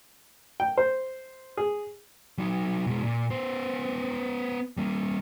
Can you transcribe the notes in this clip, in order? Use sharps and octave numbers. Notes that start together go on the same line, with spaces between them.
G5
C5
G#4
F#3 D#4
B2 G#3
A#2
B3 C5
G3 A#3